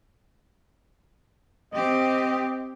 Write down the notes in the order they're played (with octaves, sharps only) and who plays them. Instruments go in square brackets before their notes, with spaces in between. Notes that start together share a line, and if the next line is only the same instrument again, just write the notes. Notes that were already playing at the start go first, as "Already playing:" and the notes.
[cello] C4 G4 [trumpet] D#5